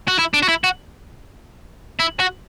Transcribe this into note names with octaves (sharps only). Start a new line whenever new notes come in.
F#4
E4
D4
F#4
E4
F#4
E4
F#4